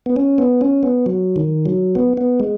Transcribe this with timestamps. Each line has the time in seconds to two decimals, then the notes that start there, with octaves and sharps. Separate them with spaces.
0.06 B3
0.16 C#4
0.38 B3
0.61 C#4
0.83 B3
1.06 F#3
1.36 D#3
1.66 F#3
1.95 B3
2.17 B3
2.40 G#3